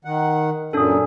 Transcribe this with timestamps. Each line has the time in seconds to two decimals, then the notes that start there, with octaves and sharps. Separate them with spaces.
0.05 D#3 F#5
0.73 F#2 A#2 C#3 C#4 D4 A4 G#5 D#6